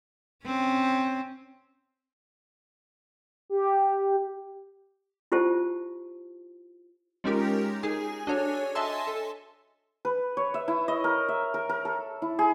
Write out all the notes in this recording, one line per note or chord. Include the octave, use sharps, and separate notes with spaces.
C4 C#4
G4
E4 F4 G4 C5 A5
G#3 C#4 D#4 F4 G4 A#4
D#4 G#4 G#5
D4 F#4 A4 C#5 G#5
D#5 E5 G#5 A5 C6 E6
A4
B4
C#5
E5
E4
D#5
A#4
E5
A#4
A#4
A4
E4
G#4